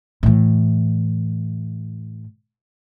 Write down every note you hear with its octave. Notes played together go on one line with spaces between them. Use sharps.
A2 E3